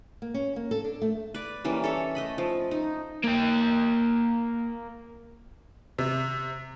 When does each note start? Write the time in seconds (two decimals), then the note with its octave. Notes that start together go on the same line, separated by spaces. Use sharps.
0.22 A#3
0.34 C#4
0.56 A#3
0.71 A4
0.84 D4
1.02 A3
1.34 B4 D5
1.64 E3 G3 A#3 C#4
1.84 A4 C#5 E5
2.15 A3 D#5 B5
2.38 F3
2.71 D#4
3.24 A#3 G5
5.98 C3